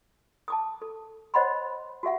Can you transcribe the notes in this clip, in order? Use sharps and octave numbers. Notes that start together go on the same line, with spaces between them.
A5 D6 D#6
A4
C5 C#5 D#5 F#5 B5 C6
F#4 G4 E5 F#5